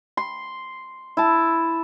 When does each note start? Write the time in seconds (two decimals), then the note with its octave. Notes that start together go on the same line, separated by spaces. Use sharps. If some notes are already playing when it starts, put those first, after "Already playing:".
0.17 C6
1.17 E4 A5